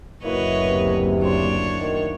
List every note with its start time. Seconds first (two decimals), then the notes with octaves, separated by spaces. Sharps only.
0.24 F#1 D2 A#3 E4 F#4 B4 C#5 D#5
0.67 C3
1.21 D4 F#4 C5 C#5
1.80 D#3